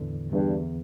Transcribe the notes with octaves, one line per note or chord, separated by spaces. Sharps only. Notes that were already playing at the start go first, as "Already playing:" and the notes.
Already playing: E2 A2 D3 E3
E2 G2